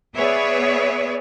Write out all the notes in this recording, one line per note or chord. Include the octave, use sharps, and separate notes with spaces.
B3 G#4 B4 C#5 D5 E5